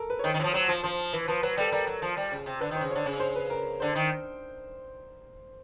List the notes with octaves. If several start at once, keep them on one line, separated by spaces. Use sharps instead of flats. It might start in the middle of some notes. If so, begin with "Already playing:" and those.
Already playing: A4 A#4
B4
C#5
D#3 C5
D#3
E3 C#5
F3
F#3 C5
F3 C5
F3 C5
E3 B4
F3 B4
F#3 B4
G3 A4
G3 A#4
F#3
F3
G3
C#3
C3
D3 B4
D#3 C5
C#3
C#5
D3
C#3
C5
B4
A#4
D3 C5
D#3